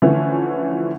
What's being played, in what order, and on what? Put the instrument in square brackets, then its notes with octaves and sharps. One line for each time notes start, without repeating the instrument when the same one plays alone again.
[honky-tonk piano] D3 E3 F3 A3 C#4